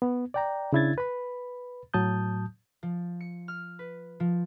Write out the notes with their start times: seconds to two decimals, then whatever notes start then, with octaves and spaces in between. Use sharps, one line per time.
0.02 B3
0.34 D5 G5 A#5
0.73 C#3 D4 E4 E5 G#6 A6
0.98 B4 B5
1.94 A2 F#3 A5 D#6 G6
2.83 F3
3.20 C#7
3.48 F6
3.79 B4
4.20 F3